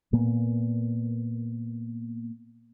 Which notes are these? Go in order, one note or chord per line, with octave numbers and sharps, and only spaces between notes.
A#2 A#3 B3